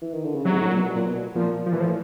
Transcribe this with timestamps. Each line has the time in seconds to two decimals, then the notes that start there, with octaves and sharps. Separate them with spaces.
0.02 E3
0.13 D#3
0.24 D3
0.35 C#3
0.45 C3 F#3
0.53 G#2
0.61 A2
0.68 A#2
0.75 B2
0.95 A#2
1.06 B2
1.35 A#2 F3
1.66 F3
1.72 A#2 E3
1.80 A2 F3